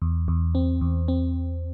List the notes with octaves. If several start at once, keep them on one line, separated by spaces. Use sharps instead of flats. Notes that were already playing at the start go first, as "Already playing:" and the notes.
E2
E2
C4
E2
C4